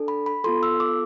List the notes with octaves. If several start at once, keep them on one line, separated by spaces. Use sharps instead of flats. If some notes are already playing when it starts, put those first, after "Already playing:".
Already playing: D4 A4
B5
B5
B3 F4 A4 C6
E6
D6